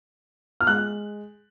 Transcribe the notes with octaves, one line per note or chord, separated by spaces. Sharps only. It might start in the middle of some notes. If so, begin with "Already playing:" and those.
F6
G#3 F#6